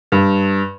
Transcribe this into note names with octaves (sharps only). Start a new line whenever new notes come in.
G2